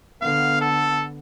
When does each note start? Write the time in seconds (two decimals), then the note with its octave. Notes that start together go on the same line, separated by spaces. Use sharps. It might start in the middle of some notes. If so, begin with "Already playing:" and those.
0.22 D3 B3 F5
0.61 A4